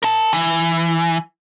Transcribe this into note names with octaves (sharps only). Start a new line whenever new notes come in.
A#4 A5
E3